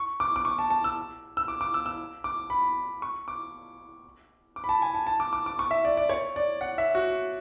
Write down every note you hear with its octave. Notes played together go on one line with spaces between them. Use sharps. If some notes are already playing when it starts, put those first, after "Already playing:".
Already playing: C#6
D6
D6
C#6
A5
A5
E6
E6
D6
D6
E6
E6
D6
B5
C#6
D6
D6
B5
A5
G#5
A5
A5
D6
D6
D6
C#6
E5
D5
D5
C#5
D5
F#5
E5
F#4